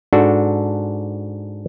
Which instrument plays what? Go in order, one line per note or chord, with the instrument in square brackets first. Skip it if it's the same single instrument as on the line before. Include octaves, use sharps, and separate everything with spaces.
[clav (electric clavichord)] G#2 D4 F#4 A4